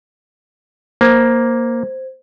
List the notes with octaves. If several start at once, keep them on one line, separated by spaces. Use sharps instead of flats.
A#3 C5 G#6